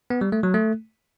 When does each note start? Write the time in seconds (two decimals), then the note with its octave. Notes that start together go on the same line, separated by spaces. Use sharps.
0.10 B3
0.21 G3
0.32 A3
0.43 F#3
0.54 A3